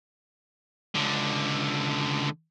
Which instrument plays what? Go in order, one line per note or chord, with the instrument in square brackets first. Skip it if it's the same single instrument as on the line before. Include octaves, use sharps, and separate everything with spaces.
[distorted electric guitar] C#2 D3